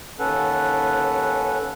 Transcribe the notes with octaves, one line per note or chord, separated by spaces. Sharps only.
D#2 C#4 A4 B4 F#5